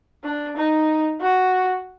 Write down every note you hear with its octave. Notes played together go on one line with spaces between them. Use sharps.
D4
D#4
F#4